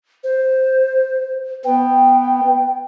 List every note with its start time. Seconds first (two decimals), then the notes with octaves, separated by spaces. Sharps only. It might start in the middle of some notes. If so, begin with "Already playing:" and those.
0.24 C5
1.65 B3 G5